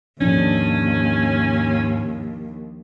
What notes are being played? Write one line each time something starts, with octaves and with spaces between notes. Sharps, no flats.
D#2 G#2 F3 C#4 D4